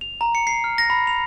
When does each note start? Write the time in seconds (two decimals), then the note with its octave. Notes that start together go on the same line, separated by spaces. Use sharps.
0.01 F7
0.21 A#5
0.35 C#7
0.47 C7
0.64 F6
0.78 A#6
0.90 B5
1.07 F7